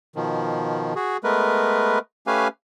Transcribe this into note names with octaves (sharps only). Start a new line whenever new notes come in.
B2 D#3 F3
F#4 G#4
G#3 A3 B3 A#4 B4
A3 C#4 G4 B4 F5 G#5